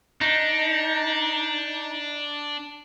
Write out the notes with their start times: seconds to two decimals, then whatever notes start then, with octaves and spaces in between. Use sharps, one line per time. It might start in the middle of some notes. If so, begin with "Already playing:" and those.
0.21 D4 D#4